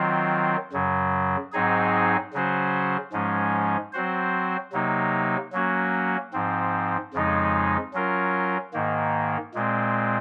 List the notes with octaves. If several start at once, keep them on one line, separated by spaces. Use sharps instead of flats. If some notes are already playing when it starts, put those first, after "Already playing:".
Already playing: D#3 F#3 C4 F4
F#2 C#3 F#3
G#2 F#3 C4 D#4 G#4
C#3 F#3 C#4 F#4 C5
G#2 F3 G#3 C#4
F#3 C4 F#4 C5
C3 F#3 A#3 D#4
F#3 A#3 C#4 F#4
G#2 F3 C4
F2 C#3 F3 G#3 D#4
F#3 C#4 F4 A#4
G#2 D#3 A#3
A#2 G#3 C4